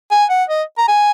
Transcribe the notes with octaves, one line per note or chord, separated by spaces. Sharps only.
G#5
F#5
D#5
A#5
G#5